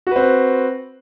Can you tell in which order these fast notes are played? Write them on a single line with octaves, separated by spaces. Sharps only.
F#4 B4 C4